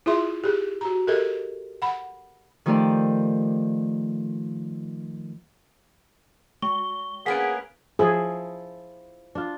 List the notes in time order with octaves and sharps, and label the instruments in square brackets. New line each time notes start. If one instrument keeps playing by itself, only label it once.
[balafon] E4 F4 G#4 E5 C6
G4 G#4
F#4 A#5
G4 A4 A#4 D#5
F#5 B5
[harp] D#3 F3 A3 G4 A#4 D5
[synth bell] G#3 G7 [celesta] C#6
[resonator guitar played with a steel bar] A#3 B3 C#4 [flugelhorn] G#4 [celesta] F#5 [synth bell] B6 D7
[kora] F3 E4 [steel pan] G#4
[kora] D4 F4